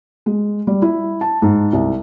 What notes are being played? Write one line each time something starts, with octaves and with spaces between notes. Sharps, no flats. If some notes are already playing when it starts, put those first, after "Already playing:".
G#3
G3
E4
A5
G#2
C2